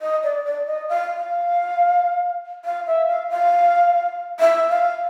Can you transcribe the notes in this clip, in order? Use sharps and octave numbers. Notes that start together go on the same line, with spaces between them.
D#5
D5
D5
D#5
F5
F5
F5
E5
F5
F5
E5
F5